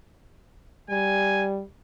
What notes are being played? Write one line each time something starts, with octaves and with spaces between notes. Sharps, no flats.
G3 G#5